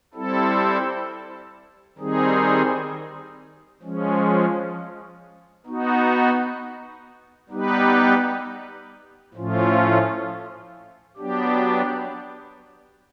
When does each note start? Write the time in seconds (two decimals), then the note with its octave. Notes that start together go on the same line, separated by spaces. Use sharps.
0.14 G3 C4 E4 A4
1.98 D#3 G3 C4 D#4 G#4
3.82 F3 G#3 C#4
5.66 B3 D#4 F#4
7.49 G3 B3 D#4 G4 B4
9.34 A2 F3 A3 C#4 F4
11.17 F#3 B3 D4 G4